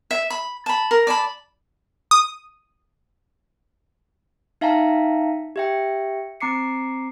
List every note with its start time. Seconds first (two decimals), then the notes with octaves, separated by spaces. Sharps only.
0.11 E5
0.30 B5
0.66 A5 B5
0.91 A#4
1.07 D5 A5 B5
2.11 D#6
4.61 D#4 E5 F5 G5 A5 A#5
5.56 G4 E5 G5
6.40 C4 A#5 D6 C7 C#7